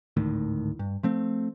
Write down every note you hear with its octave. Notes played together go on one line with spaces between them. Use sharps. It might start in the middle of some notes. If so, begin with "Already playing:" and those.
G#1 D2 A2 D#3
G2
F3 A3 C4